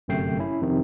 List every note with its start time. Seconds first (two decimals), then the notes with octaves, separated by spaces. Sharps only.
0.08 G1 F#2 C3 A3 G5 C7
0.39 C#4 E4
0.61 F2 C3 D#3